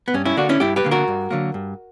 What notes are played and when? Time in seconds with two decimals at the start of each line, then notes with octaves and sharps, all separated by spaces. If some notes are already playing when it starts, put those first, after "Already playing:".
0.08 B3
0.14 G2 C#4
0.25 C#4 E4
0.37 D3 A#3 D4 F#4
0.49 C#4 E4
0.60 G2 E4 G4
0.76 G4 B4
0.84 D3 A#3
0.91 F#4 A#4
1.08 G2
1.31 D3 F#3 A#3
1.54 G2